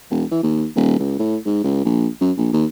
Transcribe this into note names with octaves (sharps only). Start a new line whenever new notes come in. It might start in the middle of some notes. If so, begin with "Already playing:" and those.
E1
E3
D#2
D#1
C#2
A2
G#2
C#2
A#1
F#2
A#1
D#2